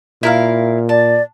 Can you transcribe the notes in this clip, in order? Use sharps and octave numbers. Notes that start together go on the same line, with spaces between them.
A#2 E4 A#4 F5
D5 A5